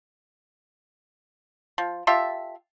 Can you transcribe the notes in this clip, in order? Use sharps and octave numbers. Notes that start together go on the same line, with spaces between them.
F3
F4 G4 A4 E5